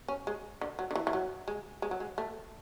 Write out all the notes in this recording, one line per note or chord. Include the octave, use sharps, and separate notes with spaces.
C#4
G#3
D3
F#3
D3
E3
E3
F#3
G#3
G#3
F#3
G#3
A3